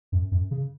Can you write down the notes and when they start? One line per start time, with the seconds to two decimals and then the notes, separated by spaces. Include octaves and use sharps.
0.12 F#2
0.31 F#2
0.51 C#3